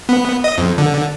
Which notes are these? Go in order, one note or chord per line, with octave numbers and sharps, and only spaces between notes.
B3
D#5
F2
D3